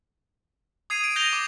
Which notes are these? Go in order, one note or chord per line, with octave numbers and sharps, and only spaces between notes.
D#6 G#6 C7 D#7
D7
G6 A#6 D#7 F7 G7
D6